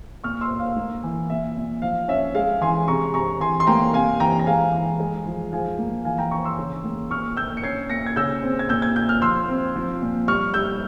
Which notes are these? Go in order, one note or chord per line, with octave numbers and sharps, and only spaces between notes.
A#2 C#6 F6
C6 E6
A#2
F5
A#3
E3
A#2 E5
A#2
F3 F5
C#4 E5
G#3 F5
E3 G#5 C6
C3 A#5 C#6
C3 A#5 C#6
E3 G#5 C6
C6
A#3 G5 A#5
C3 F5 G#5
E3 G5 A#5
A#5
G#3 F5 G#5
E3
G#3
F3
F3 F5 G#5
A#3
E3 F5 G#5
G5 A#5
E3 A#5 C#6
C6 E6
C#3
A#3
A#2 C#6 F6
A#2 E6 G6
C#7
C#4 G#6 C7
A#2 A#6 C#7
G#6
C#3 E6 G6
C4
G#6
A#2 E6 G6
G#6
A#2 G6
F6
F3 C6 E6
C4
F3
A#2
G3 C#6 F6
G3 E6 G6